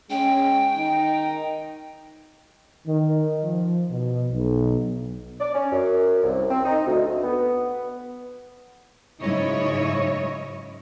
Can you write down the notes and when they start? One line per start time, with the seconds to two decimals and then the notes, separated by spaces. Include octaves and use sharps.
0.10 G#3 C#4 G5
0.75 D#3 D#4
2.86 D#3
3.42 F3
3.90 B2
4.30 B1
5.40 D5
5.54 C#4
5.72 F#2
6.24 C2
6.50 C4
6.65 D#4
6.87 D2
7.07 D2
7.23 B3
9.21 G#2 C#3 F#3 E4 C#5 D#5